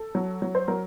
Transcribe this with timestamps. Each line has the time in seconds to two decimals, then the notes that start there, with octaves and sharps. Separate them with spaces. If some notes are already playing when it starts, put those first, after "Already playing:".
Already playing: A4
0.15 F#3
0.42 F#3
0.55 C5
0.68 F#3 A#4